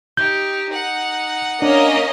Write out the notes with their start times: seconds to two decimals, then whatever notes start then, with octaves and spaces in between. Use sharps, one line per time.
0.17 D#4 G4 G6
0.69 D#4 F#5
1.62 A#3 C#4 D4 D#5